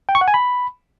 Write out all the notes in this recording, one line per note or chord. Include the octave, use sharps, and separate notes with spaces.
G5
C#6
F#5
G#5
B5